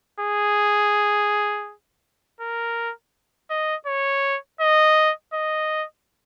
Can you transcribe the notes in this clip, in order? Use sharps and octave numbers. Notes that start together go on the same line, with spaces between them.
G#4
A#4
D#5
C#5
D#5
D#5